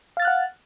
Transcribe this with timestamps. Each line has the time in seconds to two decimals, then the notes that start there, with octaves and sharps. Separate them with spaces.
0.17 F5
0.20 A6
0.22 F6
0.25 F#6
0.27 F#5